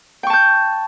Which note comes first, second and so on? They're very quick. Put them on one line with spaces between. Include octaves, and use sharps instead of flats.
G5 C#6 A5 G6